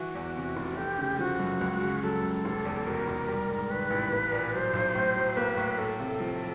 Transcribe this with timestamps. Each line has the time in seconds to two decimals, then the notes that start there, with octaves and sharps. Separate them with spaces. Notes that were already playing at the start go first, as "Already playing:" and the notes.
Already playing: E3 F#4
0.15 E2
0.36 C3
0.56 F1
0.77 A3 G4
0.98 C#3
1.19 F3 F#4
1.39 F#2
1.61 C#2
1.81 C#3
2.02 F#3 A4
2.23 C#2
2.45 F1
2.65 E2
2.86 B2 A#4
3.07 F1
3.27 G3
3.49 G#2
3.70 D#3 B4
3.90 A1
4.11 A#3
4.32 A#2
4.53 F#3 C5
4.73 B1
4.95 A2
5.16 F#3
5.36 A#3 B4
5.57 A2
5.78 A3 A4
6.00 C3
6.20 F3